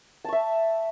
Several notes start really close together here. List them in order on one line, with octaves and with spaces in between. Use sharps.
A5 C#6 E5